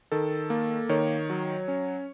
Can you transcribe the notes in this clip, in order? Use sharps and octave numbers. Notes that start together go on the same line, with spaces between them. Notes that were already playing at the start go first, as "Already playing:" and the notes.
D#3 A4
A#3
D#3 C#5
F#3
C#4